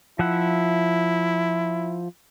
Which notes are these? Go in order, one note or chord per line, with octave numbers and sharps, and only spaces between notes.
F3 E4 E5 F#5